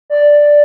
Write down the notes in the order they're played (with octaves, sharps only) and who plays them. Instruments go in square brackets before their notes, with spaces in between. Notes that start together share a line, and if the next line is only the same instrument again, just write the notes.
[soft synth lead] D5